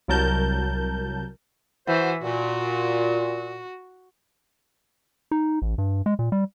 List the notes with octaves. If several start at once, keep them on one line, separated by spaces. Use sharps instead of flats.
C2 F#3 A#4 A5 G6
E3 F#4 C5
A#2 F#4
D#4
A1
G2
G#3
A#2
G3